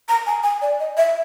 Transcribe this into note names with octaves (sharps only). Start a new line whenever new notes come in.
A#5
G#5
G#5
D5
D#5
E5